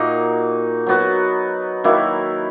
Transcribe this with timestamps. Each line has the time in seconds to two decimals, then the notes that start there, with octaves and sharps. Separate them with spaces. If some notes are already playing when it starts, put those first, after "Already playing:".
Already playing: A#2 A#3 D#4 F#4
0.87 F#3 B3 F#4
1.84 D#3 F#3 A#3 E4